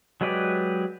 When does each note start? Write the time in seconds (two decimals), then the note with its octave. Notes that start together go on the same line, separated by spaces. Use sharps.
0.21 F#3 G#3 G4 B4 D5